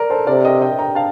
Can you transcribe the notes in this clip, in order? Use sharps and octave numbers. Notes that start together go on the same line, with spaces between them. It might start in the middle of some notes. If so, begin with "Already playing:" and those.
Already playing: A#4 D5
A4 C5
C3 A#4 D5
D#5 G5
D#5 G5
G5 A#5
F5 A5